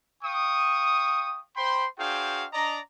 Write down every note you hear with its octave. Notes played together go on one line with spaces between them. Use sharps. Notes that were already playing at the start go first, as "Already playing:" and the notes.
F5 G5 C#6 D#6
C5 G5 B5 C6
D4 F#4 G#4 C5 F5 G5
D4 D5 D#5 A#5